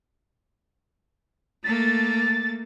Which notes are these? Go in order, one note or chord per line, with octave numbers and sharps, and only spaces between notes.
A3 A#3 A6